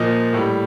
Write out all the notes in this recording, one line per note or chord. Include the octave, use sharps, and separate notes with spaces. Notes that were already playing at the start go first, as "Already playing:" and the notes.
Already playing: A#2 F3 D#5
A2 G3